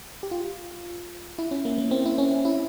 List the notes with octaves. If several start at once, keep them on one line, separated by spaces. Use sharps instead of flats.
G4
F4
E4
C#4
A#3
A#3
C4
E4
C#4
E4